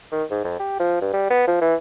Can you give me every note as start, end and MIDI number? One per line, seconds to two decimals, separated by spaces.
0.11 0.24 51
0.30 0.40 44
0.44 0.58 41
0.60 0.77 67
0.80 0.98 53
1.01 1.12 43
1.13 1.27 55
1.30 1.46 59
1.47 1.59 53
1.61 1.75 52